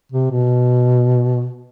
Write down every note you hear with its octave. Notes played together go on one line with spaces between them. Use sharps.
C3
B2